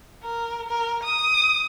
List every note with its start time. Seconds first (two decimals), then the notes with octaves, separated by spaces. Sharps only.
0.23 A#4
0.69 A#4
1.03 D#6